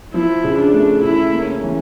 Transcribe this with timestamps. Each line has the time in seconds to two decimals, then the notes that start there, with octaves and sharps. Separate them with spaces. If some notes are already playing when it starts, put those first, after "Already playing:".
0.14 F3 E4
0.44 C#3
0.59 D4
0.73 A3
1.03 C#3 E4
1.32 A#3
1.48 C#4
1.63 E3